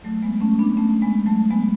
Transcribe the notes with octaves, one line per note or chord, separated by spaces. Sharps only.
F#3 A3
G#3 B3
A3 C#4
B3 D4
A3 C#4
G#3 B3
F#3 A3
G#3 B3